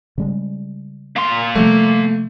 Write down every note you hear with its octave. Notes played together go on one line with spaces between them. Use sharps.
C#3 G3 G#3
A#3 C6
C3 F3 G3 A3